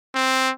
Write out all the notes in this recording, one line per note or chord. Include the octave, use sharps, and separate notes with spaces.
C4